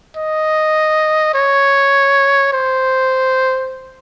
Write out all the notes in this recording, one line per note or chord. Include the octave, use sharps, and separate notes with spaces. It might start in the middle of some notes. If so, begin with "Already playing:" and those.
D#5
C#5
C5